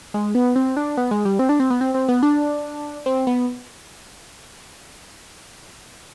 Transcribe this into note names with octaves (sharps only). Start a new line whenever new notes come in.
G#3
B3
C4
D4
B3
G#3
G3
C4
D4
C4
B3
C4
C4
B3
D4
C4
B3